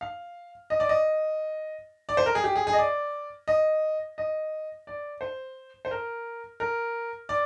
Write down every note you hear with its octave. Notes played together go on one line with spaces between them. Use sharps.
F5
D#5
D5
D#5
D5
C5
A#4
G#4
G4
G#4
G#4
D#5
D5
D#5
D#5
D5
C5
C5
A#4
A#4
D5